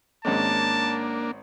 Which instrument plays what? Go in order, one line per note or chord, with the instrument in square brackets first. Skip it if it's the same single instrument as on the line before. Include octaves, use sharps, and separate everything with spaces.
[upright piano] G#1 G#3 C#4 [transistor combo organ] A#3 D4 [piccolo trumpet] A5